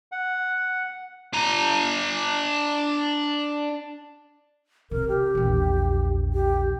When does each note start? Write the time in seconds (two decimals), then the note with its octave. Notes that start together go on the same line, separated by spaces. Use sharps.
0.12 F#5
1.33 D4 A#5
4.91 C3 A#4
5.08 G4
5.35 A#1 E2
6.34 G4